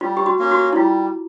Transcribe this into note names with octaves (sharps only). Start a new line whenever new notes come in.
G3 F4
G4
F#4
A#3 C#4
F#4
E4
G3 F4